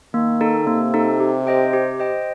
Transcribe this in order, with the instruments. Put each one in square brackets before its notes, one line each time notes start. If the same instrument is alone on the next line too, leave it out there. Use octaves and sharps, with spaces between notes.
[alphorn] D#3 [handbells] A#3
[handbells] D#4 A4
[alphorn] C3 [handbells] A#3
[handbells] D#4 A4
G4
C5 D#5 G5
G4
C5 D#5 G5